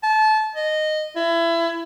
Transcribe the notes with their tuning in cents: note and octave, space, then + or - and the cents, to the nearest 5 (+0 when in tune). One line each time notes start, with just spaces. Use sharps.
A5 -25
D#5 -15
E4 +25